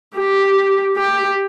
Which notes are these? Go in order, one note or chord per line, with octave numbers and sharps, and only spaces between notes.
G4
G4